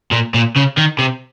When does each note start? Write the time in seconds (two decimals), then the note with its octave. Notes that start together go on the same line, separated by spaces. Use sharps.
0.12 A#2
0.34 A#2
0.56 C#3
0.77 D#3
0.99 C3